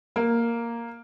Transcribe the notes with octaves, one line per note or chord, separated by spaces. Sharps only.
A#3